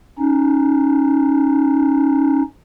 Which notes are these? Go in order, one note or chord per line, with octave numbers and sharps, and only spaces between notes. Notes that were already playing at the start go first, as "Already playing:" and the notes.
C#4 D#4